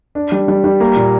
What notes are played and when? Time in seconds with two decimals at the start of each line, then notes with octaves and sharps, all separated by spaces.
0.15 D4
0.32 G3
0.48 G3
0.64 G3
0.80 A#3
0.97 A#2